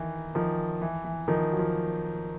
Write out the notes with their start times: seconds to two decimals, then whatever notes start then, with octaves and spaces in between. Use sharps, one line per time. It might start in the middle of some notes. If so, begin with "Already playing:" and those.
Already playing: D#3 E3
0.35 D#3 F3
0.81 E3
1.05 E3
1.28 D#3 F3
1.52 F#3
1.59 F3